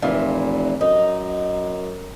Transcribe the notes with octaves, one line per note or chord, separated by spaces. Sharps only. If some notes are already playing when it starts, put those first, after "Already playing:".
F1 A#2 E3
F#2 D#4